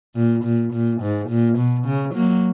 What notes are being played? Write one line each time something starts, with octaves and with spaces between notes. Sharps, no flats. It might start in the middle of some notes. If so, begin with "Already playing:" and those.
A#2
A#2
A#2
G#2
A#2
B2
C#3
F#3 A#3